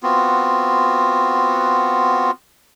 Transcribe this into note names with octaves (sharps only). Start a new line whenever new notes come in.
B3 C4 F4 F#4